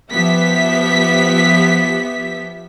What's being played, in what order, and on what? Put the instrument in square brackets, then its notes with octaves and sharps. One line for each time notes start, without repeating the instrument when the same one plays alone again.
[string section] F3 B3 G4 E5 B6